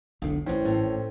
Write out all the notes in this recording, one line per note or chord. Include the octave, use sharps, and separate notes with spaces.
F1 B1 A2 D3
A1 G2 E3 C4 C#4
A2